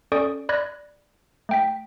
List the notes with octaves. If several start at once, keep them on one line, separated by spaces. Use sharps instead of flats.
C#4 A4 D5 C#6 D#6 D7
D5 B5 F#6 G#6 A#6
A3 G5 B6